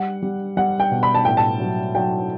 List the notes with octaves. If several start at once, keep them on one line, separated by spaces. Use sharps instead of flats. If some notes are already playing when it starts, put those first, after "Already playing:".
Already playing: G3 F#5
G3
G3 F#5
G5
B2
B5
A5
A2 G5
A5
F#3
F#3 G5